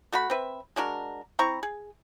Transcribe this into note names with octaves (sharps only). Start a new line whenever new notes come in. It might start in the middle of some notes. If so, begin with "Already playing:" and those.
A3 F#4 F#5 B5
C4 B4 E5
G#3 D4 F#4 A#4
C4 E4 A#5 C#6
G#4